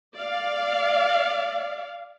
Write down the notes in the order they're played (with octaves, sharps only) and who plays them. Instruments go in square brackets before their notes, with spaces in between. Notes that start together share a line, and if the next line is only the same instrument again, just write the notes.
[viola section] D5 F5